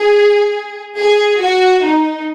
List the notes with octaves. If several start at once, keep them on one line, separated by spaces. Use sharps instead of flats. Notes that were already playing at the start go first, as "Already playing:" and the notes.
Already playing: G#4
G#4
F#4
D#4